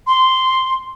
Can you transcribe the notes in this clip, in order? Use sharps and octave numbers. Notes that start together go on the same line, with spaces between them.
C6